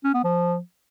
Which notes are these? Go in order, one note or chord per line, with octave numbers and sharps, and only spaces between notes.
C#4
B3
F3